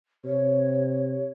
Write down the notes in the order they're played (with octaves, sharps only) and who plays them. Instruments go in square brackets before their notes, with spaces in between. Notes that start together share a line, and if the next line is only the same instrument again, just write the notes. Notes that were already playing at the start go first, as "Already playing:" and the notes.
[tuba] C3 [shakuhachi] C#5